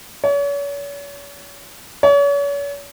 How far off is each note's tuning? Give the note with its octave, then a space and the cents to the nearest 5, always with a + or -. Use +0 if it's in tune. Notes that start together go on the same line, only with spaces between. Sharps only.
C#5 +40
C#5 +40